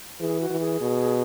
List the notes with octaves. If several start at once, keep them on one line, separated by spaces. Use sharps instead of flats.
E3 G#4
F#4
E3
G#4
B2